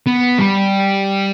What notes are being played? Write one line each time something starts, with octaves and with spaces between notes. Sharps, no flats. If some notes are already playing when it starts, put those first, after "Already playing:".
B3
G3